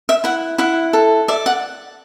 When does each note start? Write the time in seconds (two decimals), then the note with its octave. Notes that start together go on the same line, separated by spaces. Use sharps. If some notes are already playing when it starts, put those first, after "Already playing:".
0.09 E5
0.24 E4 F#5
0.58 E4 F#5
0.93 A4
1.28 D5 E5
1.46 F#5